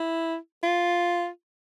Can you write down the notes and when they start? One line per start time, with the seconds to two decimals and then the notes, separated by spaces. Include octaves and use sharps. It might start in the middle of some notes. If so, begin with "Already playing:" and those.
Already playing: E4
0.63 F4